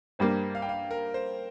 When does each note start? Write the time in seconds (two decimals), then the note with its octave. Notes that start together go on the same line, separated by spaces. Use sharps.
0.19 G2 G3 A#3 C5
0.55 F5
0.62 G5
0.69 F5
0.91 A#4
1.14 C5